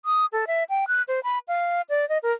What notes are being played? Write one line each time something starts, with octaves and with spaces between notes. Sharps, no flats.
D#6
A4
E5
G5
F#6
C5
B5
F5
D5
D#5
A#4